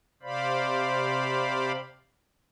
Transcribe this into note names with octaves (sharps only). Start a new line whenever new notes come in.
C3 C5 D5 F5 B5